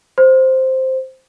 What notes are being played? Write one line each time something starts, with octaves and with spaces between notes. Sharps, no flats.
C5